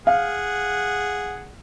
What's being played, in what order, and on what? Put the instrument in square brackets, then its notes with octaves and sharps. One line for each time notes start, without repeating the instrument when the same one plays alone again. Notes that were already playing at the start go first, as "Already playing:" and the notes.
[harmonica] G#4 F#5 [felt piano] F5